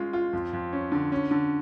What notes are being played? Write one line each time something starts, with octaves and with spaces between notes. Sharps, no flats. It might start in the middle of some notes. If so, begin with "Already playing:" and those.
Already playing: G#3 C#4 F4
F4
F2
F2
C#4
D3
C#4
D3